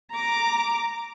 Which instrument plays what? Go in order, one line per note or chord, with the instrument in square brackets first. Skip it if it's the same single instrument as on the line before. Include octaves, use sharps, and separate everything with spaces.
[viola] A#5 D6